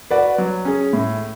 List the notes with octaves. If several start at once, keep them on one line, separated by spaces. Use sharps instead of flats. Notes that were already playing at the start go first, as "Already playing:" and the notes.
F#4 B4 D5
F#3
C#4 G#4
A2